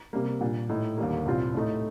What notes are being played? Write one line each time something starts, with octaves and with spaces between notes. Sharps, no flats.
C3 G3 A#3
A#2 G3 D4
A2 A3 D#4
D#2 D3 G3 A#3
C2 A#2 G3 C4 F4
A2 A3 D#4